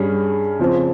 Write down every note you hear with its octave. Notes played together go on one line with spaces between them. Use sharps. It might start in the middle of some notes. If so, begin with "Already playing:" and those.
Already playing: G2 G3 C#4 G#4
C#3 F3 C4